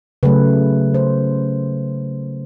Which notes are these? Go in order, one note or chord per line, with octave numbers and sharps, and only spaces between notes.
C#3 F#3 A3 B4
C5